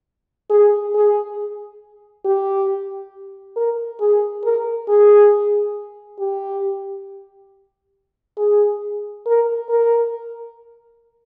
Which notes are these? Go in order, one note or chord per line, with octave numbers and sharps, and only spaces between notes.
G#4
G#4
G4
A#4
G#4
A#4
G#4
G4
G#4
A#4
A#4